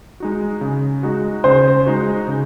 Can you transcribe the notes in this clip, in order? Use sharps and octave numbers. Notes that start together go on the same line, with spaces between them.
G#3 D#4 F#4
C#3
G#3 D#4 F#4
C#3 C5
G#3 D#4 F#4
C#3